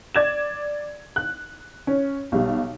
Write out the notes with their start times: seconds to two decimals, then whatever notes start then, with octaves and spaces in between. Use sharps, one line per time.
0.15 D5 G#6 E7
1.16 F#6
1.87 C#4
2.32 B1 G3